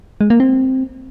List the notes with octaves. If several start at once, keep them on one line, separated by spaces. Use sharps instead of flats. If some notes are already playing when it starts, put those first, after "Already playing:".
G#3
A#3
C4